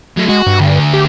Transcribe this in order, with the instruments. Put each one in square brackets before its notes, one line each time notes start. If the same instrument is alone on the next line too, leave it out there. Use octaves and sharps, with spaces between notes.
[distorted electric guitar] F#3 A3
[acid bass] G#3 [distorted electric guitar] F#4
[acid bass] G2
[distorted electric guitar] D2
[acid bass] G4